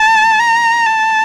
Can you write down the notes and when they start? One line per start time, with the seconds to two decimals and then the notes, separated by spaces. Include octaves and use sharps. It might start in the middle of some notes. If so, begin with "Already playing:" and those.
Already playing: A5
0.39 A#5
0.86 A5